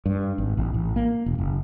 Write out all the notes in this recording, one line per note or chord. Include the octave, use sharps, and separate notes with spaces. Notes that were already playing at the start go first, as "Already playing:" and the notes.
G2
G#1
A1
A1
A#3
E1
F#1